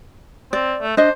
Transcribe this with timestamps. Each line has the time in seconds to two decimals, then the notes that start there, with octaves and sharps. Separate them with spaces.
0.53 C4 D5
0.82 A3
0.97 D4 C5 D#5